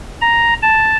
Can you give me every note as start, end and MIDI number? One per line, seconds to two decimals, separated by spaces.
0.21 0.54 82
0.63 0.97 81